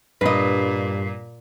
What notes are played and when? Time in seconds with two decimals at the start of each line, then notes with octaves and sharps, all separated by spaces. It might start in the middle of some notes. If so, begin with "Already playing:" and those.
0.21 G2 A#2 B4 D#5